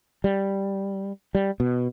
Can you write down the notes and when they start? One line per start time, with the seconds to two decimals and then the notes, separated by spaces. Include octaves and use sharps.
0.24 G3
1.35 G3
1.60 B2